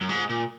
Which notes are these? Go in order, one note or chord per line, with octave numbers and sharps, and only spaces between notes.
F#2
G#2
A#2